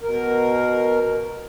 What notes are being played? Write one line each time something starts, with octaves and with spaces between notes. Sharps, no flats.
B2 A#4